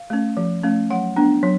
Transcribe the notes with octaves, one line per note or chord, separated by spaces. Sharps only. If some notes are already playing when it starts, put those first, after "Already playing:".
Already playing: F5
A3 C#4
F3
A3 C#4
F#3 F#5
B3 D4
F#3